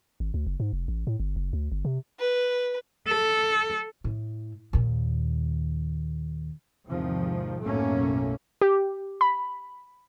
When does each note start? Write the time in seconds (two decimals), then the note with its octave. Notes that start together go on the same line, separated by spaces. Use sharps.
0.20 G#1
0.34 D2
0.47 F#1
0.60 G#2
0.73 F1
0.88 A1
1.07 A2
1.20 G1
1.36 F#1
1.53 D2
1.72 G1
1.85 C3
2.19 B4
3.08 A4
4.04 A2
4.73 D#2 A#2
6.88 E2 G#2 C3 D#3 F3
7.62 B1 F#2 A2 A3 A#3 C#4
8.61 G4
9.21 B5